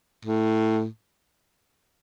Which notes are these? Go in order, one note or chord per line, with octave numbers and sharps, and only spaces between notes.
A2